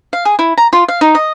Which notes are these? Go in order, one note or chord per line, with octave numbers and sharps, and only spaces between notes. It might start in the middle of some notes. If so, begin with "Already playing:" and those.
F5
G#4
E4
A#5
F4
F5
D#4
D#5